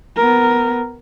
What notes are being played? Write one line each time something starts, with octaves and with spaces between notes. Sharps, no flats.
B3 A#4